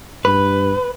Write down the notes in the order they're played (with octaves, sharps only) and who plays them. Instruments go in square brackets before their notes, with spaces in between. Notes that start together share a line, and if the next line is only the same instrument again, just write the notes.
[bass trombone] G2 [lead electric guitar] B4